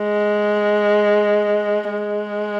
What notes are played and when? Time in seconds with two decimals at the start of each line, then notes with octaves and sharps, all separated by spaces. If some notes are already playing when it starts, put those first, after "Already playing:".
Already playing: G#3
1.91 G#3